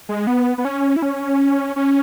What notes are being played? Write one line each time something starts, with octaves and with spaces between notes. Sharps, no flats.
G#3
B3
B3
C#4
E4
C#4
C#4